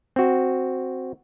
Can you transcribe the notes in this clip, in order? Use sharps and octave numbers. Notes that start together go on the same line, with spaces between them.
C4 F#4